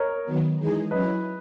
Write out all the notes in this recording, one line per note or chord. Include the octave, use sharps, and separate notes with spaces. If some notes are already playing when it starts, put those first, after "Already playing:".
Already playing: A#4 C#5 D#5
D#3 F#3 B3
E3 G#3 D#4 G#4
F#3 C#4 E4 B4 D#5